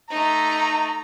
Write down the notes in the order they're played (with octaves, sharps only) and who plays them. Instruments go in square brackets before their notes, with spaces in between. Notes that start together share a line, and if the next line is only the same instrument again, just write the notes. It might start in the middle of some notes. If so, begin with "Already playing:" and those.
[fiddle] A3 D#4 [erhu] A#5